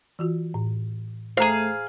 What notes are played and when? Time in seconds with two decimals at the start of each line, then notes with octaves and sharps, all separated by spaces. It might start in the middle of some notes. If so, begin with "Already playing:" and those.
0.19 E3 F4 F#4
0.54 A2
1.37 A3 G#4 C5 F5 A#5